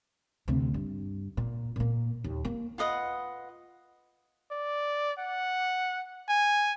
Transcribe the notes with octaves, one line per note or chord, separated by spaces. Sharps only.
D2 C3
G2
A#2
A#2 A#3
D#2
A#3
F4 B4 D#5 F#5
D5
F#5
G#5